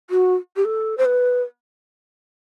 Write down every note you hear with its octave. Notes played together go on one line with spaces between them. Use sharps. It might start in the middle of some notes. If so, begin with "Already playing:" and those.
F#4
G4
A4
C5
B4